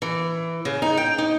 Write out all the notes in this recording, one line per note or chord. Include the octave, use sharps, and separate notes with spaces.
E3
C#3
D#4
G5
D#4